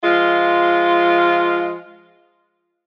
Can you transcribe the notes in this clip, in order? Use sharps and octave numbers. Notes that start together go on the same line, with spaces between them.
F3 G#3 F4